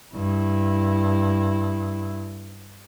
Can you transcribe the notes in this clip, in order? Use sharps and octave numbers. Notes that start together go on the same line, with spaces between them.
G2 E4